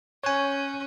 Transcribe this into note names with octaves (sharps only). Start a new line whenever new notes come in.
C#4 C#5 G#5 C#6 F#6 G6